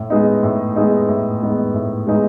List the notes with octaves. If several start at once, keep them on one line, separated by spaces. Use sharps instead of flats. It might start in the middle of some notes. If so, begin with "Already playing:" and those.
Already playing: A2
G#3 B3 D#4
A2
G#3 B3 D#4
A2
G#3 B3 D#4
A2
G#3 B3 D#4